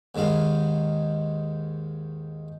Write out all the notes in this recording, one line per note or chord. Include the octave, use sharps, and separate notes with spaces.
D#2 G#2 D#3 G#3 F5